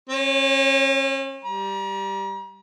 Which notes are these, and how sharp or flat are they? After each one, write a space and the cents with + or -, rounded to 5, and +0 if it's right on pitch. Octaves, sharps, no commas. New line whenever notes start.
C#4 -40 C#5 +0
G3 +0 A#5 +40